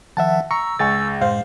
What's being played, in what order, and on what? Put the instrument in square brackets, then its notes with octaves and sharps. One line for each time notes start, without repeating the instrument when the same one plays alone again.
[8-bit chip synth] D#3 F3 [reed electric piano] E5 F#5 A5
[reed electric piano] A#5 C#6 [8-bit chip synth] E6
[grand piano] C#2 G#5 [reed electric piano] C#6 A6
[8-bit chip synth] F#2 A2 G#3 [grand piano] C5 [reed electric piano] F5